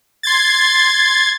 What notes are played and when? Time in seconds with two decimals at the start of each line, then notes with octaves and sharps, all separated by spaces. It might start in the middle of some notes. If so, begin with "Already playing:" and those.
0.23 C6 G#6 A6